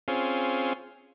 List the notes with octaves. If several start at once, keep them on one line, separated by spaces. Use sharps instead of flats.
C4 C#4 F4 G#4